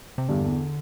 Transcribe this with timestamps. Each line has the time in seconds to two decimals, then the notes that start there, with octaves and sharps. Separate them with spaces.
0.18 C3
0.28 E2 G2 D3
0.45 E2